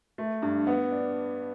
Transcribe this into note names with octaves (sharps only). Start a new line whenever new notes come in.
A3
G2
B3
D4